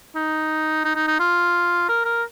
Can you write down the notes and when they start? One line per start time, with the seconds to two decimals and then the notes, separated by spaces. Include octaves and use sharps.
0.15 D#4
0.85 D#4
0.96 D#4
1.08 D#4
1.20 F4
1.89 A#4
2.05 A#4